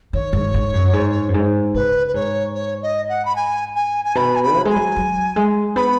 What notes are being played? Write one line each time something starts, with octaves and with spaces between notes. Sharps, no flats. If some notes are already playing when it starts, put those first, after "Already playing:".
D#3 C#5
G#2
G#2
F#2
G#2
F#2
G#2
C#3 B4
B4
G#2 C#5
C#5
D#5
F#5
B5
G#5
G#5
G#5
B2 B5
G#5
B5
F#3
G#3 G#5
F#3
F#3
G#3
B3 B5